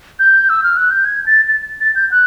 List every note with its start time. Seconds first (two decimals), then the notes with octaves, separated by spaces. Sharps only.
0.19 G6
0.49 E6
0.63 F6
0.77 F#6
0.91 G6
1.05 G#6
1.26 A6
1.47 A6
1.80 A6
1.95 G6
2.11 F#6